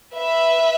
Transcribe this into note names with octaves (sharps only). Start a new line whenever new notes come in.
B4 E5